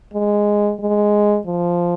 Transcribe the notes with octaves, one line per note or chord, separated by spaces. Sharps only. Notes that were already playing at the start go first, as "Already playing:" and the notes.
G#3
G#3
F3